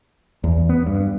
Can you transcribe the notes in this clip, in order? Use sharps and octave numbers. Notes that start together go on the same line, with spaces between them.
E2
B3
G2